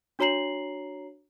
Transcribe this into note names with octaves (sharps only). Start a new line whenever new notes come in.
D4 F#4 C#5 A#5 C7 F#7